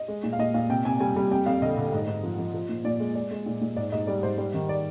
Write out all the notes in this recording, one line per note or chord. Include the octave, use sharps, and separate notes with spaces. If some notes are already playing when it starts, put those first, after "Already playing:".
Already playing: D#5
G#3
A#2
F5
A#2 D#5
A#2 F5
C3 G5
C3 G#5
G3 G#5
G3
F2 G5
F2 F5
D3 D#5
D3
G#2
G#2
F3
F3
F3
A#2
A#2 D5
G#3
G#3 D5
G#3
A#2
A#2
G#2 D5
G#2 D#5
G3 D5
G#2 C5
G3 D5
D#3
D5